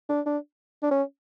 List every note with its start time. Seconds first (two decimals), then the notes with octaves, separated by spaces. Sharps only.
0.09 D4
0.26 D4
0.83 D4
0.91 C#4